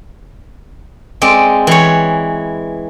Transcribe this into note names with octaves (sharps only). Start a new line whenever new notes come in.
G#3 C4 D5
E3 C#5